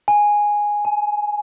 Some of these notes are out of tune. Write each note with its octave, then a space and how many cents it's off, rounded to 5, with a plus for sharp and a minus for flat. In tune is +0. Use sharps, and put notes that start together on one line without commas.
G#5 -5
G#5 +35